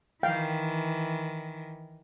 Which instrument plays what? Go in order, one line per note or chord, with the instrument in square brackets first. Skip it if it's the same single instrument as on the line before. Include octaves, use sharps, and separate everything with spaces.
[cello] D#3 E3 [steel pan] F5 G5